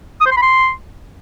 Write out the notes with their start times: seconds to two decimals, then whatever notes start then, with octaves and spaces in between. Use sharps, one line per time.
0.21 D#6
0.26 C5
0.31 C6
0.37 B5
0.42 C6